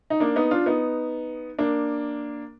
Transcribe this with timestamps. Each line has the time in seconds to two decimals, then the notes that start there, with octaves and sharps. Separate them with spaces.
0.10 D#4
0.20 A#3 D4
0.36 B3 D#4
0.51 D4 F4
0.66 B3 D#4
1.59 A#3 D4